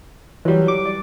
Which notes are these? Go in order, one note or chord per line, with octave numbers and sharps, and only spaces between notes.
E3 F#3 G3
D6
D5